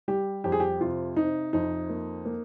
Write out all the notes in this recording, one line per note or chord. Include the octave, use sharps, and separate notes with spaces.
G3 G4
F2 G4
G#4
G4
C3 F4
C3 D#4
F2 D#4
A#3
A#3